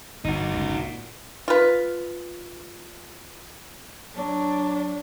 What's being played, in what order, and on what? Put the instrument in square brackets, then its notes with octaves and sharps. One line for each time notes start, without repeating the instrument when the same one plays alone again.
[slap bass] G1 [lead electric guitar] D#4 F#4
[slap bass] G1 C#2
A#2
[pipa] F4 B4
[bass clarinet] F#3 [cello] D4